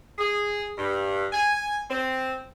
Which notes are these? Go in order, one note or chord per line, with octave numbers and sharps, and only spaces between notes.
G#4
G2
G#5
C4